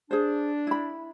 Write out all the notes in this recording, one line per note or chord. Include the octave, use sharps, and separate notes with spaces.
D4 G#4 C5
E4 B5